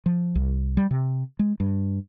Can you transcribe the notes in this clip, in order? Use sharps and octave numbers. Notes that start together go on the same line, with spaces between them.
F3
C2
G3
C3
G#3
G2